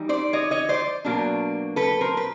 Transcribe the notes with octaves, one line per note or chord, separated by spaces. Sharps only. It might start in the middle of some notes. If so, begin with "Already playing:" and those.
Already playing: E3 G3 D#4
C5 D5
C#5 D#5
C#5 D#5
C5 D5
B2 F#3 A#3 D4
A4 B4
A#4 C5
B4